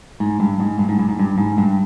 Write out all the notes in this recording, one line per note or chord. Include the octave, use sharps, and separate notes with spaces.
G#2
G2
G#2
G2
G#2
G2
G#2
G2
G#2
G2